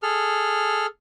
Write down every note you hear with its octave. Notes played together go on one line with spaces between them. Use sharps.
G#4 A4 F6